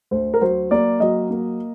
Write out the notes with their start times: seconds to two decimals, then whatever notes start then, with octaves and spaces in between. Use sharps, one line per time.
0.11 D2 C5
0.34 A#4
0.41 F#3 C5
0.71 A#3 D5
1.00 F#3 D#5
1.30 A#3